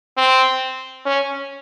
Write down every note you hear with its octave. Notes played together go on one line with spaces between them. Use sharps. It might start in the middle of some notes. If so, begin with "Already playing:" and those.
C4
C#4